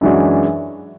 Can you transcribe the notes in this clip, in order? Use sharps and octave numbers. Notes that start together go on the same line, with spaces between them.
F#2 E3 G#3 D4 F#4